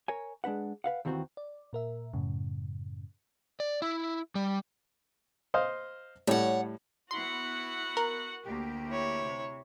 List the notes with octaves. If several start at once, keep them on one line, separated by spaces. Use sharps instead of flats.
A#4 C#5 G#5
G#3 D4 B4 F#5
B4 F5 F#5
D#2 D#3 E3 C4 F#4
D5
A#2 A#4 E5
F#2 A2 C#3
D5
E4
G3
C5 D#5 F5
A2 G3 C#5 F#5
B3 E4 F#4 F#5 C6
A#4
D2 A#3 G4
E4 C#5
C3